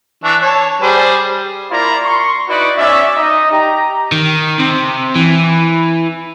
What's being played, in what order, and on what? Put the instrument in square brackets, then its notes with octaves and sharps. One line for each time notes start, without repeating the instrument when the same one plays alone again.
[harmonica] E3 D4 C#6
C#5 A5
G3 G#4 C5
[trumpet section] A#3 E4 F4 D5 A#5 B5
C6 C#6
D#4 E4 F#4 B4 D5 B5
B3 C#4 D5 E5
D#4 D#5
G4 A#5
[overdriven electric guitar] D#3
C3
E3